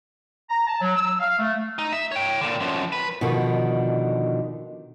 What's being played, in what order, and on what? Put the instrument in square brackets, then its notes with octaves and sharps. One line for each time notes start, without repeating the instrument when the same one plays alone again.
[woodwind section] A#5
A5
F#3
E6
F5
A3
[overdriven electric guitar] D#4
E5
C#5 G5
A#2 D3
F#2 F3
B4
[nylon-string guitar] B2 D3 D#3 F3